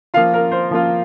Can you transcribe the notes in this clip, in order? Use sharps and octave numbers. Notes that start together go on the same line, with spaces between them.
F3 A#3 F4 F5
A#4
C5
F3 A#3 F4